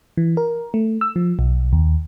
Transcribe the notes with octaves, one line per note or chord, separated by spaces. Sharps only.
E3
A#4
A3
E6
F3
B1
D#2